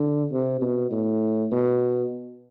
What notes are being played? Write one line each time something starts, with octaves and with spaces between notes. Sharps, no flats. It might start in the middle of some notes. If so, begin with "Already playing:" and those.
Already playing: D3
C3
B2
A2
B2